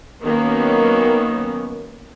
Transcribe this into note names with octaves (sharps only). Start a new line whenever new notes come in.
D#3 F#3 A#3 B3 C#4